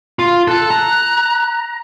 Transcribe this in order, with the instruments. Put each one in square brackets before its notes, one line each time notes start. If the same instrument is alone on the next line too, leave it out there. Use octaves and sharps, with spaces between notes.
[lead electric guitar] F4
[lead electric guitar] A4 A5 [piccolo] F#6
[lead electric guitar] A#5